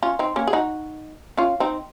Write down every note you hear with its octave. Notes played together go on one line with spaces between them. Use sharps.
C#4 F4
C4 D#4
A#3 C#4
G#4
D#4 F#4
C#4 F4
C4 D#4